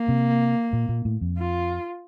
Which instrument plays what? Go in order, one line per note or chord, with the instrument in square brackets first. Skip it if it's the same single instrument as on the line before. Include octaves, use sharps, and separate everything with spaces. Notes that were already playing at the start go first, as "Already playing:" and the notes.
Already playing: [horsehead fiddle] A#3
[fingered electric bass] C3
A#2
A#2
A2
F2
[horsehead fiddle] F4